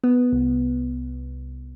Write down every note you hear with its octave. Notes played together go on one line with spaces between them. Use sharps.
B3
C2